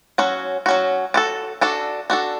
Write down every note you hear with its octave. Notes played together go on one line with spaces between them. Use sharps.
F#3 C#4 F#4
F#3 C#4 F#4
D4 F#4 A4
D4 F#4 A4
D4 F#4 A4